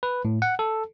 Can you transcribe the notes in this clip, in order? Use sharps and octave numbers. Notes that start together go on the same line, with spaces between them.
B4
A2
F#5
A4